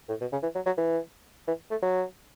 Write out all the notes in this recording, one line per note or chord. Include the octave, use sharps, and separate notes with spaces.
A2
B2
C#3
E3
F#3
F#3
E3
E3
A3
F#3